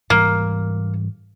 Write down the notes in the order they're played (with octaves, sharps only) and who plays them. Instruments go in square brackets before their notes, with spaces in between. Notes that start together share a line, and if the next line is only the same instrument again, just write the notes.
[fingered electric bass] G#2 E3 G3 [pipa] A#3